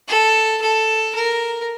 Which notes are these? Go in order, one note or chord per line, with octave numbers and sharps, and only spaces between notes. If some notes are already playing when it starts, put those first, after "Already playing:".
A4
A4
A#4